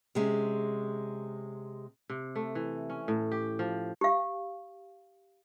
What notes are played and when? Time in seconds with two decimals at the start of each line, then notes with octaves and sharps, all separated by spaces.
0.15 C3 G#3 C#4
2.09 C3
2.36 A3
2.55 E3
2.90 C#4
3.08 A2
3.32 G4
3.59 F3
4.01 G4 F5